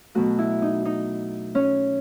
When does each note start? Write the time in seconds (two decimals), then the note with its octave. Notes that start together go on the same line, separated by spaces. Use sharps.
0.15 B2 F#3 A3 F#4
0.39 E4
0.62 D#4
0.85 D#4
1.55 C#4